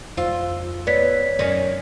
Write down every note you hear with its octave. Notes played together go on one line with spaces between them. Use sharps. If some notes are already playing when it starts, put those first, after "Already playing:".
F2 F4 C5 E6
B3 C#5 D5 B6
F#2 D#3 C#4 D5